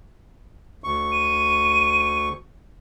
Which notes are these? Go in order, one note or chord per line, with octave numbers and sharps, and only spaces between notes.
D2 C#6
D#7